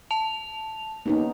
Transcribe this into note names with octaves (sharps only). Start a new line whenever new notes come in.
A5 F7
D#2 B3 C#4 D#4